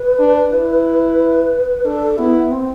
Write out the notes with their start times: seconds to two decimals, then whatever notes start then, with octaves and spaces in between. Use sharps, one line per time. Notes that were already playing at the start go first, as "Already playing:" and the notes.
Already playing: B4
0.19 D4
0.52 E4
1.84 D4 A4
2.17 B3 E4
2.51 C4